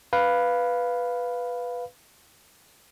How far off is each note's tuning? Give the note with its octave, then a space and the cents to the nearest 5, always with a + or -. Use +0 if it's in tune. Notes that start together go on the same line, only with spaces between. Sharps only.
B4 +0 F5 +0